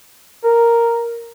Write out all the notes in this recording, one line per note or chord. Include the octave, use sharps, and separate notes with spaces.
A#4